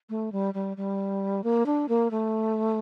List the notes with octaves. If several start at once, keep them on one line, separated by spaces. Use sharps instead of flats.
A3
G3
G3
G3
A#3
D4
A#3
A3